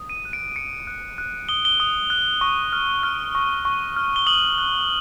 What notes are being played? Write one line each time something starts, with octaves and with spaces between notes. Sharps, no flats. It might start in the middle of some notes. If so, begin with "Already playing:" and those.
Already playing: D#6
D#7
F#6
D7
D#6 C#7
F#6
F#6
D#6 G7
G7
D#6
F#6
C#6
F6
F6
C#6
C#6
F6
G7
D#6 F#7
F#6